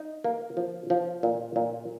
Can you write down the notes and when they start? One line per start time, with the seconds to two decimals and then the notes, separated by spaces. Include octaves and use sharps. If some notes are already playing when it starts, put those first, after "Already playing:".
Already playing: D#4
0.24 A#3
0.57 F3
0.90 F3
1.23 A#2
1.56 A#2